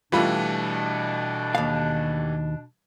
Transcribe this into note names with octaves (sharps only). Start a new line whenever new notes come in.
B2 E3 G3 A3 D4 F4 B5
D#2 F5